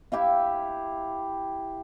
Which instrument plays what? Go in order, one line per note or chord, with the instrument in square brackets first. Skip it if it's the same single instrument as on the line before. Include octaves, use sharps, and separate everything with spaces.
[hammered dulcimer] E4 G4 E5 F5